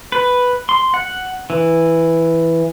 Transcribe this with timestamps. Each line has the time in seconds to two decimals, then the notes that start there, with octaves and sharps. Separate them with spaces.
0.12 B4
0.69 C6
0.94 F#5
1.50 E3